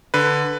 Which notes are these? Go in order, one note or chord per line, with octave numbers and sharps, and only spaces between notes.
D3 B4